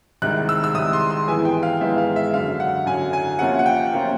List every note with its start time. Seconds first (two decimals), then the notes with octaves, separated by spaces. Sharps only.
0.22 C2 C3 D#3 G#3 F#6
0.49 E6
0.64 E6
0.75 C2 C3 D#3 G#3 D#6
0.93 C6
1.10 C6
1.28 G#2 E3 G#3 B3 E4 G#5
1.45 G5
1.63 F5
1.81 G#2 E3 G#3 B3 E4 E5
1.98 F5
2.16 E5
2.34 F#2 D3 F#3 F5
2.60 F#5
2.86 F#2 D3 F#3 G#5
3.13 G#5
3.39 C3 F3 A#3 C#4 F4 F#5
3.59 F#5
3.66 G5
3.93 C3 F3 A#3 C#4 F4